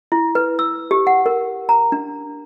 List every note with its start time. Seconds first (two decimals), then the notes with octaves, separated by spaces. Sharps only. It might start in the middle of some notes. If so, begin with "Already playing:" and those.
0.12 E4
0.35 B4
0.59 E6
0.91 G4
1.07 F#5
1.26 A#4
1.69 A#5
1.92 D4